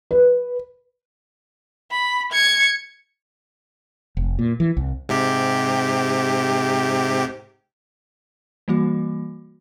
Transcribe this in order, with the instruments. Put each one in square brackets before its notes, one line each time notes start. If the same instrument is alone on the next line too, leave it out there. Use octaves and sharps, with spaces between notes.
[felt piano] B4
[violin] B5
G#6 C#7
[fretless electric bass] F1
A#2
E3
C2
[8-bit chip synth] G#2 C3 G4
[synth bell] E3 G3 A#3 F#4